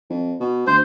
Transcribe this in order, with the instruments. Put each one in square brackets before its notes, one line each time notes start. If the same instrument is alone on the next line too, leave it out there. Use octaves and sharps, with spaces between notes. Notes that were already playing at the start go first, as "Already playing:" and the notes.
[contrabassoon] F2
B2
[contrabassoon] D2 [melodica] C5